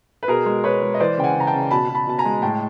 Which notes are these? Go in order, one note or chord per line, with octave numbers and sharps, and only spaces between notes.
B4
B2 G#4 A#4
G#3
B2 B4 C#5
G#3
D#5
E3 C5 D5
C#3 G5
F#5 G#5
C#3
A#5
G5 A5
C#3
B2 A5 B5
B2
A5 B5
B2 A5
G#5 A#5
G#3
A2 G5 A5